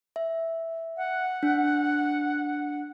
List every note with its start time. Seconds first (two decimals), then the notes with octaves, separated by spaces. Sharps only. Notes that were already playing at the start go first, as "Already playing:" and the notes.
0.16 E5
0.97 F#5
1.43 D4